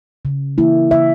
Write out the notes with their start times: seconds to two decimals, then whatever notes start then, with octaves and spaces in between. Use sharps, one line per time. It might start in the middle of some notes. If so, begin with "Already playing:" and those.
0.25 C#3
0.58 E3 A#3 E4
0.91 C#3 E5